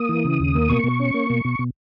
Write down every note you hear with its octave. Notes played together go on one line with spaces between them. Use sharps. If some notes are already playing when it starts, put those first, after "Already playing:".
Already playing: A#3 D#6
E3
C#3
D#2
A#3
B2 C#6
B2
C#4
A#3
B2
B2
B2